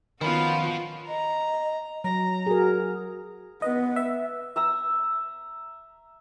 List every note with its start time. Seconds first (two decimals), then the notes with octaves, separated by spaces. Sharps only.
0.21 D#3 F3 B3 C#4 F4 F#4 B5
1.07 D#5 A#5
2.04 F#3 A#5
2.46 F#4 G#4 A#4
3.62 B3 B4 D#5
3.96 E5
4.56 E5 A#5 E6